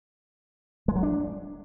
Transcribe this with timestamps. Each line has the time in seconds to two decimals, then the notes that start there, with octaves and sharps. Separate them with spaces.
0.88 G#3
0.96 F#3
1.03 D4